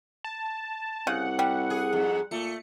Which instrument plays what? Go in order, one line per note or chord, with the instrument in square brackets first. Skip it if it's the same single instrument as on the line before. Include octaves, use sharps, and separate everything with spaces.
[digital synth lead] A5
[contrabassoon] C2 [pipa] C#3 [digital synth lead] F#5
[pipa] G3
[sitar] G#4
F2 G#2
[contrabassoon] A#2 [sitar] A3 [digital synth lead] C#7